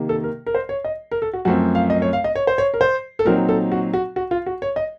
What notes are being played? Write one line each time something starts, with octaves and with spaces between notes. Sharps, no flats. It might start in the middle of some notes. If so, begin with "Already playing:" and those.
Already playing: C3 D#3 A#3
A4
A#4
A#4
C5
C#5
D#5
A#4
A4
F#4
F#2 F3 A3 C4 F#4
F5
D#5
C#5
F5
D#5
C#5
C5
C#5
A#4
C5
A4
A#2 F#3 C4 D#4 A#4
A4
F#4
F#4
F#4
F4
F#4
C#5
D#5